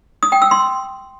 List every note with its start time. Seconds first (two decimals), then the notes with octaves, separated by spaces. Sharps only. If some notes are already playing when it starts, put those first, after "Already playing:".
0.23 D#6
0.32 G5
0.42 E6
0.51 C6